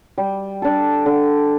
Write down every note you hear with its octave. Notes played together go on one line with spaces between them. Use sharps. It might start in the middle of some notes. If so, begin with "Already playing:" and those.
G3
D4 A4
D3